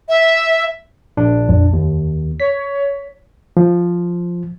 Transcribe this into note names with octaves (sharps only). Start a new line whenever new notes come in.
E5
A#1 D4
F2
D#2
C#5 B6
F3